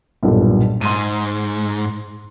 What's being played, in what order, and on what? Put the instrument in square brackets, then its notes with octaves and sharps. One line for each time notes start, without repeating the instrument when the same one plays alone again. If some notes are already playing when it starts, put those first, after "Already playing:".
[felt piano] B1 G2 A#2
[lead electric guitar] G#2 [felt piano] C6 D#7